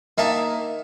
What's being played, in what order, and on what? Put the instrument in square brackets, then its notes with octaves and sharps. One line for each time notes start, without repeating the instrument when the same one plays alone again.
[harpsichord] D#3 D#4 A5 [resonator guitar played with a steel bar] A#3 E5